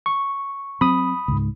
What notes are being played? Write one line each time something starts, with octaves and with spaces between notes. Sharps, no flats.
C#6
F#3 C4 B5 D#6
C#2 G#2